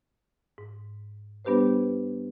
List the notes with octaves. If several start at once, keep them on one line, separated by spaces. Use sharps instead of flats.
G#2
G3 B3 D4 G4 B4 C5